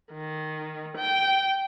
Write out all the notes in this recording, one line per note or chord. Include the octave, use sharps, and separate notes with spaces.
D#3
G5